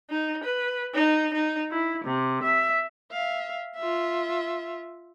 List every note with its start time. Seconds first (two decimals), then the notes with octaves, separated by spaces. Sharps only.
0.10 D#4
0.43 B4
0.94 D#4
1.34 D#4
1.71 E4
2.04 C3
2.44 E5
3.12 E5 F5
3.76 F4 E5